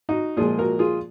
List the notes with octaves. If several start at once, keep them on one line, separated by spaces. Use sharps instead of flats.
D#4 F#4
A#2 F3 G#3 F4 G#4
F#4 A#4
F4 G#4